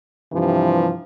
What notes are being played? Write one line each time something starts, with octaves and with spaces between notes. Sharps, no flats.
G2 C3 E3 F3